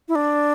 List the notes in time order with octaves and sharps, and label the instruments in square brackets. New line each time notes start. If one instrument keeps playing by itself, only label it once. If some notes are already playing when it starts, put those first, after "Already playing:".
[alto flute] E4
D4